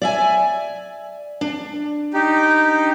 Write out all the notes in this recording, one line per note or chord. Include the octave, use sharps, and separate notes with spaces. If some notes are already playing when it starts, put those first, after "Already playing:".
D5 E5 G#5
D4
D#4 G4